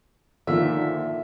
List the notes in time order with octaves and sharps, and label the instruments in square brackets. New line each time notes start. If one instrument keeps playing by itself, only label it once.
[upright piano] A#2 D#3 [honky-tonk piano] D3 F3 A#3 [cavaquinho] E5